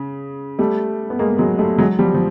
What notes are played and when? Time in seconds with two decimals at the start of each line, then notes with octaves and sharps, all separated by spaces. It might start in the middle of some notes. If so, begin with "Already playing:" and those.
Already playing: C#3
0.59 G3 A3
1.10 B3
1.19 G#3 A#3
1.38 F#3 G#3
1.59 G3 A3
1.79 F#3 G#3
1.99 F3 G3
2.14 F3